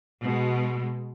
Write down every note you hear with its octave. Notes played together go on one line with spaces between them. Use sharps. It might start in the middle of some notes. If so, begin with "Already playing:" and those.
B2 G#3